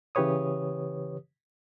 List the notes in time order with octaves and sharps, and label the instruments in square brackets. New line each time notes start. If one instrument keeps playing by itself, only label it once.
[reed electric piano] C#3 E3 G4 B4 C#5 D#6